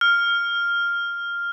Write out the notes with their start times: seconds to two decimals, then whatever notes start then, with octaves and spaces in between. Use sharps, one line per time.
0.01 F6